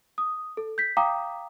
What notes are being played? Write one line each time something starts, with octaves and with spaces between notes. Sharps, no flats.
D#6
A4
G6 B6
F5 G5 A#5 D6 D#6